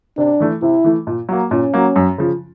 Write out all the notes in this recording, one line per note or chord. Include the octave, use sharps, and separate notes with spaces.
C3 D4
E3 A3
C3 E4
E3 A3
A#2
F#3 A#3
A#2 C#4
F#3 A#3
F#2
C#3 F3